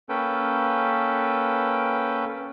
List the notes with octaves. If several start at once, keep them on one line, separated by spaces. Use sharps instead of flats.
A#3 C#4 A4 B4 G5